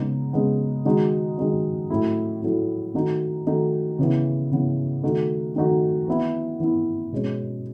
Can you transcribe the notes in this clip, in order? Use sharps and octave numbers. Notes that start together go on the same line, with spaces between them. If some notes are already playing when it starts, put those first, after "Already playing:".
Already playing: C#3 G#3 B3 D#4
C#3 G#3 B3 D#4
D#3 G#3 D#4 F#4
D#3 G#3 D#4 F#4
A2 F#3 A3 E4
A2 F#3 A3 E4
D#3 A3 D#4 F#4
D#3 A3 D#4 F#4
C#3 E3 B3
C#3 E3 B3
D#3 A3 D#4 F#4
D#3 A3 D#4 F#4
E3 B3 E4
E3 B3 E4
B2 G#3 C#4